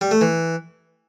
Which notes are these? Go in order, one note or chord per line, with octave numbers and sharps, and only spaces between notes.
G3
A3
E3